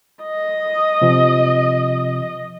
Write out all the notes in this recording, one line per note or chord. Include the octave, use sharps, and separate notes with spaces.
D#5
C3 F3 C4